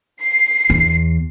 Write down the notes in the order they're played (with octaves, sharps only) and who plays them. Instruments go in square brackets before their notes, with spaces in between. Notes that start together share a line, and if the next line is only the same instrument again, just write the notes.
[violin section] C7
[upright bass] E2